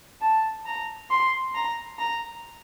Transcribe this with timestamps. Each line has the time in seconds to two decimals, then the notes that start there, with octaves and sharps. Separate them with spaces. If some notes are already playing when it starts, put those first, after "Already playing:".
0.21 A5
0.66 A#5
1.10 C6
1.55 A#5
1.99 A#5